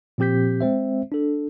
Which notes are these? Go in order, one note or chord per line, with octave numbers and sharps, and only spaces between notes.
A#2 F3 C4 G4 G6 B6
G#3 C4 C5 E5
D4 A4